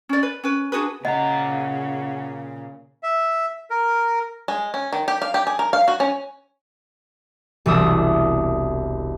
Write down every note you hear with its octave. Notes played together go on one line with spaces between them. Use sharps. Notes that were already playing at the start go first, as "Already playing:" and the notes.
C#4 D5
B4
C#4 B4
D4 F#4 G#4 B4
A#2 C#3 D#5 F#5 A#5
E5
A#4
G#3
C#4
D#3
G4
F5
G4
G#4
A#4
F5
F#4
C#4
E1 C2 E5 D#6